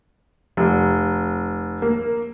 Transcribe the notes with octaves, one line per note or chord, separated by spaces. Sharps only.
F1
A#3